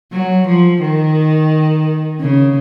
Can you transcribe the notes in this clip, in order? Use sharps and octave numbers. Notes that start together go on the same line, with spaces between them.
F#3
F3
D#3
C#3